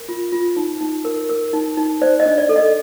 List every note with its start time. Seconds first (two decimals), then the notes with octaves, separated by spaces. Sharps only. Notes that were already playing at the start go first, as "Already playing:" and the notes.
Already playing: A#4
0.09 F4
0.32 F4
0.56 D#4
0.81 D#4
1.05 A#4
1.29 A#4
1.53 D#4
1.77 D#4
2.02 C5 D5
2.20 D#5
2.26 D4
2.38 D5
2.49 A4
2.56 D#5